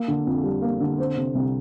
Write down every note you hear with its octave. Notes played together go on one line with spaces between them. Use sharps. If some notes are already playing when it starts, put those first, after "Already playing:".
Already playing: A#3
D3
F2
G3
A#3
D3
C4
C3
C2